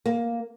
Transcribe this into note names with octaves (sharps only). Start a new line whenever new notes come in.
A#3